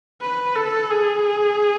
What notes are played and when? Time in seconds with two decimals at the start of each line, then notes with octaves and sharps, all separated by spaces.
0.21 B4
0.56 A4
0.90 G#4